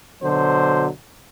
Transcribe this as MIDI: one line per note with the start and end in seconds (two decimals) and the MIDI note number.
0.22 0.88 47
0.22 0.88 50
0.22 0.88 54
0.22 0.88 72